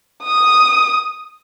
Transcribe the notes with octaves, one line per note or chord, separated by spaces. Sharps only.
D#6